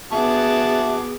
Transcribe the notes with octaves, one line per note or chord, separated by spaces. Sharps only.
B3 F#4 G#4 E5 A5 D6